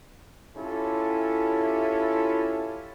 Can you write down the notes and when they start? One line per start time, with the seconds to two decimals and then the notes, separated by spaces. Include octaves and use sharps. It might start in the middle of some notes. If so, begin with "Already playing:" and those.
0.55 C#4 E4 F4 G4 A4